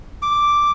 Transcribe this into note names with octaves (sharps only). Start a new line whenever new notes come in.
D6